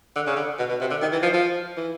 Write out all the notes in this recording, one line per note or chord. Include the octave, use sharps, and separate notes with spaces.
D3
C#3
D3
B2
B2
C3
D3
D#3
E3
F3
F3
E3